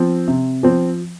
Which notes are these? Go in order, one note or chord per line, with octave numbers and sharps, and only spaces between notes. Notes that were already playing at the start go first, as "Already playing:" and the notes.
Already playing: F3 C4
C3
F3 C4